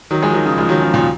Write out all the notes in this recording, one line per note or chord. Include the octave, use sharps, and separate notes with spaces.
D#3 F#3
F3 G#3
D#3 F#3
C#3 F3
F3 G#3
D#3 F#3
C#3 F3
A#2